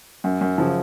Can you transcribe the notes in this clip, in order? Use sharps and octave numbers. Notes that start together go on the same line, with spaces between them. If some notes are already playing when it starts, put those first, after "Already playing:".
F#2
F#2
C#3 F3